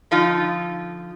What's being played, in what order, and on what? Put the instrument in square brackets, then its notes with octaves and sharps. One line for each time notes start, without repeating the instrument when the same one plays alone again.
[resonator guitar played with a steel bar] D3 F3 D#4 F4